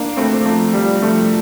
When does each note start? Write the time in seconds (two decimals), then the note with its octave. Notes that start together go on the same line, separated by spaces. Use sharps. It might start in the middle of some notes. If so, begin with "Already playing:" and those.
Already playing: A#3 D4
0.17 A3 C4
0.45 F3 A3
0.73 G3
1.02 F3 A3